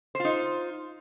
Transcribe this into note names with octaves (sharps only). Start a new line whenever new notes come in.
D#4 F4 C5